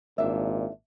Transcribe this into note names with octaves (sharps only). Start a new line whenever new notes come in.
G#1 A#2 D4 E5